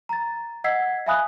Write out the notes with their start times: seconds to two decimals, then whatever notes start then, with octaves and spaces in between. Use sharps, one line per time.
0.09 A#5 A6
0.64 D#5 F#5 E6 G#6 B6 C7
1.06 E5 F5 G#5 B5 D#6 F#6